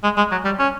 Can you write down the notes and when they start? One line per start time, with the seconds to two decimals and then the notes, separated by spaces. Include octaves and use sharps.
0.04 G#3
0.17 G#3
0.32 F#3
0.45 G3
0.60 C#4